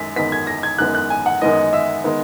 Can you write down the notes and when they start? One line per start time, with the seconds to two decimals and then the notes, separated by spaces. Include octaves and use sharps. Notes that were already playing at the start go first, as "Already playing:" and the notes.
Already playing: F#2 D#3 G#3 B6
0.16 F#2 D#3 G#3 B3 B6
0.32 G#6
0.47 A#6
0.63 G#6
0.78 F#2 D#3 G#3 B3 F#6
0.95 F#6
1.10 G#5
1.26 F#5
1.41 F#2 D#3 G#3 B3 D#5
1.73 E5
2.04 D#3 G#3 B3